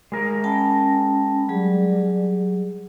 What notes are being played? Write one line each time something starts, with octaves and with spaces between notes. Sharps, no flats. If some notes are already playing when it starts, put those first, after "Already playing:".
G#3 A#4
C#4 G5 A5 B5
F#3 G3 G#4